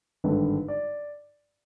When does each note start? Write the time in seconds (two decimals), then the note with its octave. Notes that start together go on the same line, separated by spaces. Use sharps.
0.24 G#1 G2 D3 B4
0.68 D5